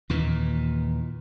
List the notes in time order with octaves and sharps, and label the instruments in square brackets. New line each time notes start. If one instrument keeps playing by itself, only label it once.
[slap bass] D#2 A#2 E3